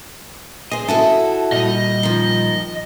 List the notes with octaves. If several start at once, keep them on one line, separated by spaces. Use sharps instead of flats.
G#4 C5 D#5
E4 F#4 A4 A5
A#2 G3 D#5
D#3 F3